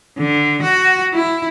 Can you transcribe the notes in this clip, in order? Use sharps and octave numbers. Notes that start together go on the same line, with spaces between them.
D3
F#4
E4